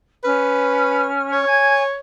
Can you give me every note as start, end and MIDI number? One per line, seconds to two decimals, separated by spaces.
0.24 1.46 61
0.24 1.08 71
0.24 1.46 89
1.32 1.99 73
1.47 1.80 80
1.47 1.80 92